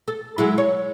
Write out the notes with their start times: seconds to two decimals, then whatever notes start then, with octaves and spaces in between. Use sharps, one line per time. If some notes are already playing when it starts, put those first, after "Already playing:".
0.08 A4
0.38 F#3 G#3 E4
0.58 C#5